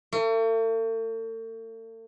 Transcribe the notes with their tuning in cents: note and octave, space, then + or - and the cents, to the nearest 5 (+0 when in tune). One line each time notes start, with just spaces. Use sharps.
A3 +45